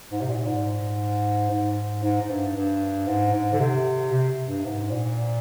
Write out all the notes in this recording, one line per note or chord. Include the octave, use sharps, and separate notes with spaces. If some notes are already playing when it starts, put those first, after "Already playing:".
G#2
C3
A#2
G#2
G#2
G#2
G#2
G2
G2
G#2
G#2
D3
C3
C3
G2
G#2
A#2